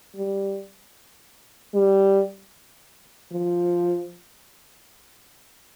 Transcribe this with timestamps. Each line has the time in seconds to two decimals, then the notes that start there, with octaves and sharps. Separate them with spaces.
0.16 G3
1.74 G3
3.32 F3